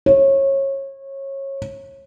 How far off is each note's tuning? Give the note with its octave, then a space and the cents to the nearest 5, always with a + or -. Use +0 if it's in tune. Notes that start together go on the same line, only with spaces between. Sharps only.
C#5 -25